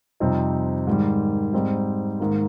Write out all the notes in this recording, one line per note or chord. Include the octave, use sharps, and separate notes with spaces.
F2 C3 G3 C4 D#4
G#2 D#3 G3
G#2 G3 C4 D#4
G#2 D#3 A#3